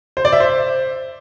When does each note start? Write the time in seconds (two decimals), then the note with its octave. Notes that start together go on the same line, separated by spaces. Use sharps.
0.17 C5
0.25 D5
0.32 E5
0.40 C5